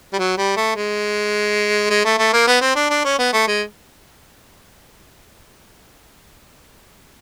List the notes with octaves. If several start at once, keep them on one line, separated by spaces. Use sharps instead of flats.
G3
F#3
G3
A3
G#3
G#3
A3
A3
A#3
B3
C4
D4
D4
C#4
B3
A3
G#3